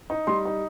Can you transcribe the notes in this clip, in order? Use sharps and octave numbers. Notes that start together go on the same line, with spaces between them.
D#4
G3 C6
D#4